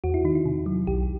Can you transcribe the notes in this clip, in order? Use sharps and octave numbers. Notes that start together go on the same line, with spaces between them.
E2 F#4
E4
D#3 D#4
E4
C3
F#3
B1 G4